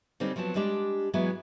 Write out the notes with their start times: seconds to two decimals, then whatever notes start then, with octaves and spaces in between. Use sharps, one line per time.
0.20 D3 G3 C4 C#4 D#4
0.36 F3 F#3 B3 C4 A5
0.55 G3 G#3 D4 G4
1.13 E3 F#3 G#3 B3 E4